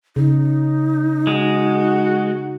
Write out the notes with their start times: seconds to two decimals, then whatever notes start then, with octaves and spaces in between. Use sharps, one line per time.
0.16 C#3 D#4
1.27 G#3 F#4